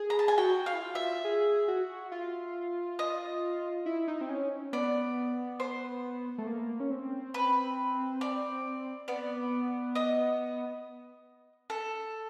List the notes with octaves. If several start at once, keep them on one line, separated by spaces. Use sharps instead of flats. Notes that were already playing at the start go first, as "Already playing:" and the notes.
Already playing: G#4
A#5
A5
G#5
F#4 G5
F5
E4
F4
E5
G#4
F#4
F4
D#5
E4
D#4
C4
C#4
B3 D5
C5
A3
A#3
C#4
C4
B4
D5
B3 D5
D#5
A4